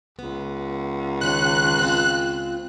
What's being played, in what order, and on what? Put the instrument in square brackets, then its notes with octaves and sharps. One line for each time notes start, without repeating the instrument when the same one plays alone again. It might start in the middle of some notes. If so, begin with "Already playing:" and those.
[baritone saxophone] C#2 [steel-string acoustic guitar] B3
[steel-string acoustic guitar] F2 D#3 C#5 [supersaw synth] F#6
[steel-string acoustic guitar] C4 F4